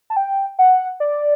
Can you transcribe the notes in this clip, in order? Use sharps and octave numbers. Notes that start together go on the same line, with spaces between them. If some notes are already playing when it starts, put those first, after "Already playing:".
A5
G5
F#5
D5